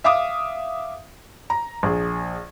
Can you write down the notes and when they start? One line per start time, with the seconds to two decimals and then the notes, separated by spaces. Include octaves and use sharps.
0.04 E5 F5 D6 D#6
1.50 A#5
1.83 A#1 G#4